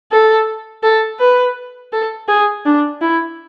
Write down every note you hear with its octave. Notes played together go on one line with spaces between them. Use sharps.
A4
A4
B4
A4
G#4
D4
E4